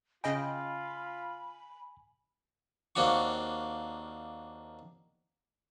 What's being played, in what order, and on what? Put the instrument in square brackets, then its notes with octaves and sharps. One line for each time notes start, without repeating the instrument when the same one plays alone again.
[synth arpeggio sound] C#3 D#5 G5 [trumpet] F4 [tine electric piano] G#5 [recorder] B5
[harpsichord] D#2 A#3 C4 D4 F#4 C#6